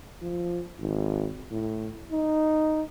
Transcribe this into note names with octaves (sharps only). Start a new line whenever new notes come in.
F3
G#1
A2
D#4